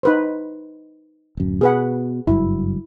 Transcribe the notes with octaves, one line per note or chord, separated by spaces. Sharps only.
D#4 B4 C5
D1 F#2
B2 G#4 B4 F#5
F#1 G2 F#3 E4